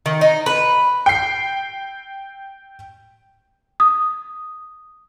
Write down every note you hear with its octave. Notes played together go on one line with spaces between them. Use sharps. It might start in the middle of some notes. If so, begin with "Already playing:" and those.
D#3
D#4
B4
G5 C7
D#6